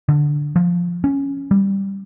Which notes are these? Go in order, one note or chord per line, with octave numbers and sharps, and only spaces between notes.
D3
F3
C#4
G3